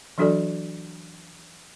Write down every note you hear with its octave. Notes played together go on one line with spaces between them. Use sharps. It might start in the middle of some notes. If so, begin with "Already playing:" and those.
E3 F#3 D4 F#4 A4 D5